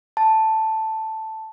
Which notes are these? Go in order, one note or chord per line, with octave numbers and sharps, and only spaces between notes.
A5